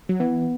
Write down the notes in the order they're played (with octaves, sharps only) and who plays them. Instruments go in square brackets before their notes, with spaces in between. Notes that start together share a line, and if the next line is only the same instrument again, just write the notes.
[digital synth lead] F#3
[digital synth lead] E3 [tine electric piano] B3